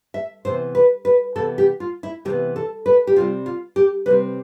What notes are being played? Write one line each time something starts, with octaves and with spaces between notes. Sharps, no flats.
E5
C3 E3 B3 C5
B4
B4
C3 E3 B3 A4
G4
F4
E4
C3 E3 B3 G4
A4
B4
G4
C3 G3 C4 F4
F4
G4
C3 G3 C4 B4